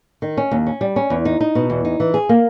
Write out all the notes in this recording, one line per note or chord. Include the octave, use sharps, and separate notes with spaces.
D#3
C#4
D#2
C#4
G3
C#4
E2
D#4
D#4
B2
E2
D#4
E3
G#4
A#3